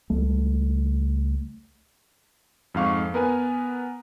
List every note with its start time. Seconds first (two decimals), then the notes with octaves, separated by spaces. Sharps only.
0.10 C#2 G3 A3
2.74 F2 G#2 F5 C#6
3.14 B3 A#4 B4 G#5